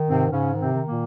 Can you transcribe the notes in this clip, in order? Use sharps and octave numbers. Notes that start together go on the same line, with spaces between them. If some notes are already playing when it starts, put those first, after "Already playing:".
Already playing: D#3
G#2 C3 C4
G#2 C#3 C#4
D#3
C3 C4
D#3
A#2 A#3